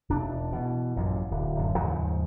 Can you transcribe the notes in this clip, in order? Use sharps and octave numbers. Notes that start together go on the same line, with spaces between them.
E1 D4
B2 E3
A1 F#2 A#2
D1
D1 F#2
D#2 G#2 C#3 F3